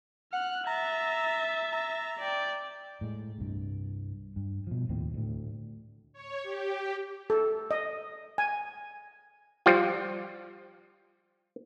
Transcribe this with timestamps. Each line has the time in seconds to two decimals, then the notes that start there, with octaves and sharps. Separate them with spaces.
0.33 F#5 F6 F#6
0.67 E5 A#5 A6
1.72 A#5
2.19 D5 G5
3.01 A2 G#3
3.39 C2 G2
4.36 G2
4.67 B2 F3
4.89 D#2 A2 F3 C4
5.14 D2 A2
6.13 C#5
6.43 G4
7.30 A4
7.71 D#5
8.38 G#5
9.66 F3 G3 F4